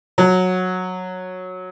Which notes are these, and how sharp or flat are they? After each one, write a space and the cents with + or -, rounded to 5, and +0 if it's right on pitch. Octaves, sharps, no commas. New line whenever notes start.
F#3 -10